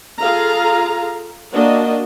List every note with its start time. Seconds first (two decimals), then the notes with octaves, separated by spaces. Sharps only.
0.21 F4 G#4 A4 F5 A#5
1.53 A#3 D4 F#4 D#5